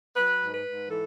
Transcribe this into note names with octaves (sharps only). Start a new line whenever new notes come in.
F#3 B4
G#2
B4
G#2
E3 A4